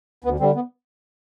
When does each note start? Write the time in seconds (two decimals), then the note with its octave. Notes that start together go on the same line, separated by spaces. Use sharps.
0.24 D2 B3
0.39 D3 G3 C4
0.55 B3